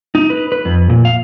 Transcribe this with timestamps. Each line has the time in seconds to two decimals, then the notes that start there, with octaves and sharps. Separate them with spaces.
0.15 D#4
0.30 B4
0.52 B4
0.65 F2
0.90 A#2
1.05 F5